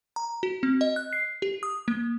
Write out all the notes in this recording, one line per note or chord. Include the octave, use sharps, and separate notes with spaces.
A#5
F#4
C4
D#5
F#6
C7
G4
D#6
A#3